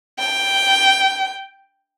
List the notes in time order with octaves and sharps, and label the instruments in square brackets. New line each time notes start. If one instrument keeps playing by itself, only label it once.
[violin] G5